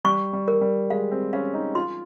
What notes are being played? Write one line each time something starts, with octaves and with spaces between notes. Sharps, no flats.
G3 C#6
G3
A#4
G3
G#3 F5
C4
C#4 F5
D#4
F4 C6